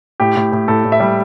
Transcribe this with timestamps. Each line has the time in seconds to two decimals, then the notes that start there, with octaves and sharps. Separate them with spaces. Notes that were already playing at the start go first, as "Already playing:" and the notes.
0.20 A2 G4
0.36 A2
0.52 A2
0.68 A2 A4
0.84 A2
0.92 E5
1.00 G3